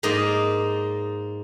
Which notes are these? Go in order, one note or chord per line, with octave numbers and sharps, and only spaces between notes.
G#2 A#3 D#4 D5 D#5